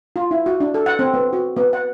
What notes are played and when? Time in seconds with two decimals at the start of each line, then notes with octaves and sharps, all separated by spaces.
0.16 F4
0.31 E4
0.46 F#4
0.60 D4
0.74 A4
0.86 F#5
0.99 C4
1.14 B3
1.33 F#4
1.56 B3
1.73 F#5